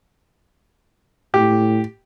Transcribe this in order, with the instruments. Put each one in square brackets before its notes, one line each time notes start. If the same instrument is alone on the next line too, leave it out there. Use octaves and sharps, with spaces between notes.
[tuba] A2 [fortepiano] G4